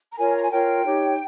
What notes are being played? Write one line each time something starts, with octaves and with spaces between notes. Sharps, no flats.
A#5
F4 A#4 C#5 G#5
A#5
G#5
F4 A#4 C#5 G5
D#4 G4 C#5